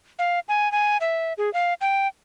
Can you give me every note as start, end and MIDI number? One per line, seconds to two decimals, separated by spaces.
0.19 0.40 77
0.49 0.71 80
0.72 0.97 80
1.01 1.33 76
1.38 1.52 68
1.53 1.74 77
1.81 2.07 79